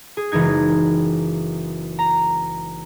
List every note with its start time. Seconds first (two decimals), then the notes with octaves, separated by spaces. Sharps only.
0.17 G#4
0.32 F#1 E3 G#3 D#4 G#6
1.99 A#5